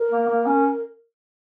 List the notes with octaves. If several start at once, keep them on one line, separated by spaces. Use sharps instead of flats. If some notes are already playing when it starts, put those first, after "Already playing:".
Already playing: A#4
A#3
A#3
C#4